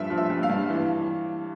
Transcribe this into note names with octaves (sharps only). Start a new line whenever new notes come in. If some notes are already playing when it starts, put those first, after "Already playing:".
Already playing: G2 F3 E5
F3
E5
G2
F5
G2
E3